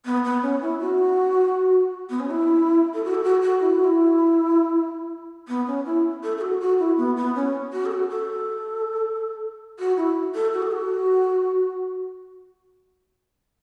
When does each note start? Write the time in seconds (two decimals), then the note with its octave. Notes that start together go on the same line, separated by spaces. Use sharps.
0.05 B3
0.24 B3
0.42 C#4
0.62 E4
0.80 F#4
2.10 B3
2.20 C#4
2.30 E4
2.94 A4
3.05 F#4
3.15 A4
3.24 F#4
3.42 F#4
3.61 E4
3.73 F#4
3.84 E4
5.48 B3
5.67 C#4
5.86 E4
6.23 A4
6.37 A4
6.41 F#4
6.61 F#4
6.79 E4
6.97 B3
7.17 B3
7.35 C#4
7.73 F#4
7.86 A4
7.91 F#4
8.10 A4
9.79 F#4
9.97 E4
10.35 A4
10.53 F#4
10.62 A4
10.71 F#4